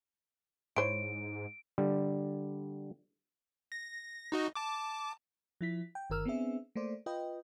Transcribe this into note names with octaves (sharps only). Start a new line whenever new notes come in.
G#2 E4 C5 C#5 D7
D3 G3
A#6
D#4 F#4 D#5
A5 D6
F3 E4 B6
G5
G1 D#3 A#4 E6 F6
B3 C4 D4 G#4 E5
A3 A#3 C5 D5
F4 B4 D#5 G5